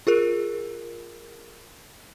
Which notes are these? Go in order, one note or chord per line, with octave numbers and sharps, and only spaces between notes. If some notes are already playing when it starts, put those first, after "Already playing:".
F4 G#4 A#4